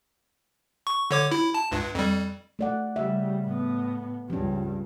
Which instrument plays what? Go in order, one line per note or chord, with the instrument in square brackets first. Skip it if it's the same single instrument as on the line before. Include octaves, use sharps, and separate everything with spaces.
[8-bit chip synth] C#6
D3 C#5 D6
E4
A5
C#2 G2
F2 G3
[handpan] A3 D5 F#5
[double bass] C#3 G3 [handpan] E5
[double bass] A2 B3
[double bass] C#2 G2 [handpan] F3 C#4